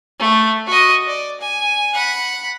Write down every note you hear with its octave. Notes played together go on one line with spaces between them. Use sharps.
A3
F#4 D#5
D5
G#5
F#5 B5